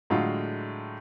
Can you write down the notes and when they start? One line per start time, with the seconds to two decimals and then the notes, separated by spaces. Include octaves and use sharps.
0.10 A2 D3 F#3 G#3 F4 F#4